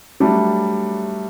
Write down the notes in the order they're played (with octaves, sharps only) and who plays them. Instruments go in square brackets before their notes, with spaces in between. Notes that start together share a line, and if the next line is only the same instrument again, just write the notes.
[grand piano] F#3 A3 D4 [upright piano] G3